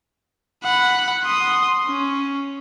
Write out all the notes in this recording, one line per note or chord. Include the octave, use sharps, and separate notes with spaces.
F#5 B5
C6 D#6
C#4